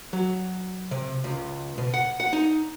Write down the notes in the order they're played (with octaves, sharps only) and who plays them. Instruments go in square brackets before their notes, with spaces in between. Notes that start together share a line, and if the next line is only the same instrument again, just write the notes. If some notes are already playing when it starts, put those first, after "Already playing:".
[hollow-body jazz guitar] F#3
C3
C#2
B2
F#5
F#5
D#4